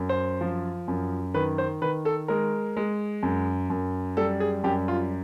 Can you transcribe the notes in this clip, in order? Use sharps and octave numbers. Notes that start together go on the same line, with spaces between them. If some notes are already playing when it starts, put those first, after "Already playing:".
Already playing: F#2
C5
F3
F#2
D#3 B4
C5
D#3 B4
A4
G#3 A#4
G#3
F#2
F#2
G3 A4
G#4
F#2 G4
F4